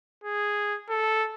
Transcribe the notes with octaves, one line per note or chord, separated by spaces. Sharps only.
G#4
A4